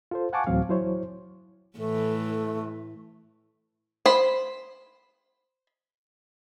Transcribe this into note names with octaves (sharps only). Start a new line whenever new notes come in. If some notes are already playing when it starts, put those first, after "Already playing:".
F4 A4 C5
F5 F#5 G#5 A5 C#6 D6
D2 A2 E3 F#3 C4 F5
F#3 E4 C5 C#5
A2 E3 A3 A4
C5 B5